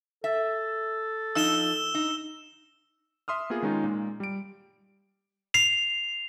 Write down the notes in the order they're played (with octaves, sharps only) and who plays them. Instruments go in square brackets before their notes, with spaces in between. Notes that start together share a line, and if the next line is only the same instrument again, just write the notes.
[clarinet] A4 [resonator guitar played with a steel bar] E5
[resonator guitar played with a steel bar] F3 D#4 [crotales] E6 E7 G7
[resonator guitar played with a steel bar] D#4
[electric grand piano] E5 C6 D#6 F6
A#3 B3 F4 G#4
D#3 G#3 C#4 D#4 F4
A#2 G#3
G3 D7
[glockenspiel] C7 F7